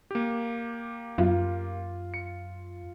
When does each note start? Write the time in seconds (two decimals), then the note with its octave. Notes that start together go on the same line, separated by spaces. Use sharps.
0.11 A#3 G4
1.18 F#2 F4
2.14 C#7